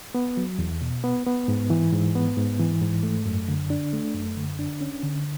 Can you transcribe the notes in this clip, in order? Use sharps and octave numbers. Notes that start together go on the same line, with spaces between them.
B3
F#3
E2
B2
B3
B3
G#2
E3
G#2
B3
G#2
E3
G#2
A3
F#2
D3
D4
A3
F#2
D3
D4
C#4
D3